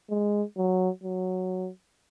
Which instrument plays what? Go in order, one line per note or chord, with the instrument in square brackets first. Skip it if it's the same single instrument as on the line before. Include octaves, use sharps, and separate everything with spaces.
[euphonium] G#3
F#3
F#3